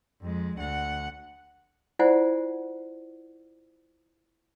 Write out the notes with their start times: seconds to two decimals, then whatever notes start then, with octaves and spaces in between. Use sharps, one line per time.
0.22 F2 G#3
0.58 D2 F#5
1.99 E4 F4 C5 D5 F#5 G#5